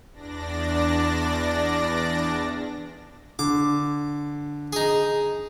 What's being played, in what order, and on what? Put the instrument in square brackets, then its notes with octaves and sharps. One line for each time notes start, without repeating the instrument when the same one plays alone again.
[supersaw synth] E2 D4 D5 A#6
[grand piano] D3 [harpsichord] D6
[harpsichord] D#4 G#4